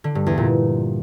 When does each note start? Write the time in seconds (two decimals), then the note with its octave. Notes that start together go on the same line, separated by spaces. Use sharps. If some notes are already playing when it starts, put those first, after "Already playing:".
0.04 D3
0.15 G2
0.26 E2
0.38 A#2